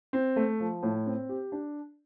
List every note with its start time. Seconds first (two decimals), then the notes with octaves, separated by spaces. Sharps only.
0.13 C4
0.36 A3
0.60 F3
0.83 A2
1.06 C4
1.29 G4
1.52 D4